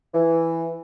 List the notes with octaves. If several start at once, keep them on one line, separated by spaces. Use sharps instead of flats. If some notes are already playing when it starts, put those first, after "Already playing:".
E3